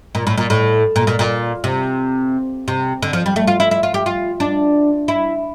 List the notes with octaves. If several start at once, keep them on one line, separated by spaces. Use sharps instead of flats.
A#2
A2
A#2
A2
A#2
A#2
A#2
C3
C3
D3
F3
G3
A3
F4
E4
E4
F4
G4
F4
D4
E4